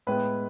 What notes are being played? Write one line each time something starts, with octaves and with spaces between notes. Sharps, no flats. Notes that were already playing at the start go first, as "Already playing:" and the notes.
A2 G#3 B3 B4